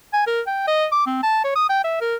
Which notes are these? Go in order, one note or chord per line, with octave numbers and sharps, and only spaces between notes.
G#5
A#4
G5
D#5
D6
C4
A5
C#5
D#6
G5
E5
A#4